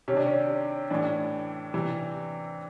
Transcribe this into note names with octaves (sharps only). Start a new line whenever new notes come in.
C3 D#3 C#4
D4
C#4
A2 E3 D4
C3 E3